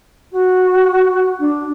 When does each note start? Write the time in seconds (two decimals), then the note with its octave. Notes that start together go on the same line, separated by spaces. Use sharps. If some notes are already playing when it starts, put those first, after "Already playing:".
0.31 F#4
1.39 D4